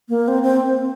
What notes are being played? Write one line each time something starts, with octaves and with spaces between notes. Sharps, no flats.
A#3
C4
C4